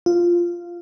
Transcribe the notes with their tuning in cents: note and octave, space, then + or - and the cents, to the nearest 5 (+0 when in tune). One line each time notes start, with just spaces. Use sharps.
F4 -5